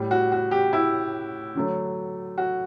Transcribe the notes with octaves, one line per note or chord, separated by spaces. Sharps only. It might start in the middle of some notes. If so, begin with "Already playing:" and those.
Already playing: A2 G3
F#4
F#4
G4
E4
D3 F#3 A3
F#4